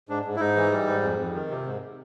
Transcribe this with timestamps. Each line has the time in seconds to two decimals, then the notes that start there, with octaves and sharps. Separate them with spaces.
0.09 G#2 D4
0.25 G#2
0.36 E4
0.40 G#2 D#4
0.56 E3
0.72 G3
0.87 G#2
1.03 F2
1.19 F2
1.34 D#3
1.50 C3
1.66 G#2